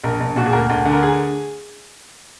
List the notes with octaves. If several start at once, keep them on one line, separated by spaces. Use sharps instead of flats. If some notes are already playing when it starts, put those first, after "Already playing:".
A#1 A#4
A#1
A#2 F#4
G#4
D2 A#4
D2
D3
A#4
G#4